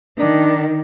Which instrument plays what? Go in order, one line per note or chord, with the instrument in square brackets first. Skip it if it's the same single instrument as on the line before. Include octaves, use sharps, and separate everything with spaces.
[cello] D#3 [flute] D4